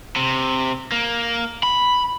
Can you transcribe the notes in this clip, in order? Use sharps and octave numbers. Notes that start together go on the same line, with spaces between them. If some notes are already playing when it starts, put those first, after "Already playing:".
C3
A#3
B5